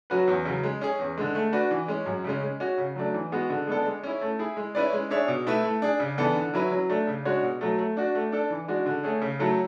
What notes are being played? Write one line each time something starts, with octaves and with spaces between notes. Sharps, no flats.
F#3 C#4 F#4 B4
E2
C#3 F#3
G#3
C#4 G#4
E2
D3 G#3
A3
D4 F#4 B4
E3
G#3 C#4
F#2
C#3 G#3 C#4
G#3
C#4 F#4
C#3
F#3 A3 D4
E3
G#3 B3 F#4
D3
G#3 B3 D4 A4
G#3
C#4 E4
A3
E4 G#4
G#3
C#4 E4 B4 D5
G#3
D4 G#4 C#5 E5
B2
A3 E4 B4 E5
A3
D4 G#4
C#3
E3 B3 D4 A4
D3
F#3 C#4 E4 B4
F#3
A3 D4
C#3
G#3 D4 F#4 C#5
B2
F#3 A3
A3
D4 F#4
A3
D4 A4
E3
G#3 D4 F#4
D3
A3 C#4 G#4
C#3
F#3 A3 E4 A4